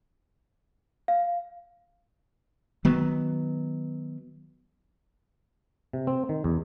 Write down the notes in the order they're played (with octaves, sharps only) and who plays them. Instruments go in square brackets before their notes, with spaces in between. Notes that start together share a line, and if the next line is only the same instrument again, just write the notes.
[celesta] F5
[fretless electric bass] D#3 F#3 B3
[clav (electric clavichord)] C3
C4
D#3
E2